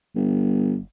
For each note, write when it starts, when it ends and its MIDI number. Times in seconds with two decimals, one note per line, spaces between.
0.15 0.78 31